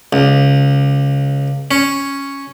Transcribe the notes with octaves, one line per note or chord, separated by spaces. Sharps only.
C#2
C#4